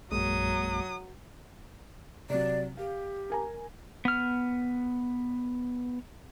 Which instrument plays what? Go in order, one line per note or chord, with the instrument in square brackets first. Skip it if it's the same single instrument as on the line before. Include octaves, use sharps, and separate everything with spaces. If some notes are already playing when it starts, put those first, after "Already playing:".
[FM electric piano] A#1 F#2 [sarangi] F#3 [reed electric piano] G#3 A#3 [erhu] D#6
[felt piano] C3 F#3 [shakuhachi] D5
[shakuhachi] G4 [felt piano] F5
[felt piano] A#4 G#5 A#5
[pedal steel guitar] B3 F6